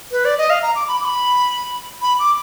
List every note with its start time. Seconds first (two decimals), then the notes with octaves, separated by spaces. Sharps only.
0.12 B4
0.25 D5
0.38 D#5
0.50 F5
0.63 A#5
0.75 D6
0.88 B5
1.00 D6
1.05 B5
2.02 B5
2.19 D6